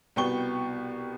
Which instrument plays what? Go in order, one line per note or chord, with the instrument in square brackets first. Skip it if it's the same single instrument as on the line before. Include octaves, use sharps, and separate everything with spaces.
[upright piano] C2 B2 B3 G5 C#6 G7